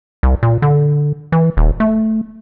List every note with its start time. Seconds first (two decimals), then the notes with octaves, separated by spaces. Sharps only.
0.23 C2
0.43 A#2
0.62 D3
1.32 E3
1.57 D#1
1.80 A3